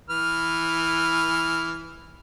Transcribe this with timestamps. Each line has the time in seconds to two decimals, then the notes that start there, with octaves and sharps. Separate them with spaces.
0.10 E3 B4 F6